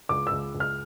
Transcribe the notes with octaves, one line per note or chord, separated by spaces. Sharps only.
C#2 D6
C#2 E6
C#2
F6